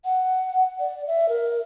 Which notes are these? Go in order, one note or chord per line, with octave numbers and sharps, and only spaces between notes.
F#5
D5
E5
A#4